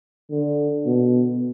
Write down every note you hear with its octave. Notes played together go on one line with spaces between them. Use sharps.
D3
B2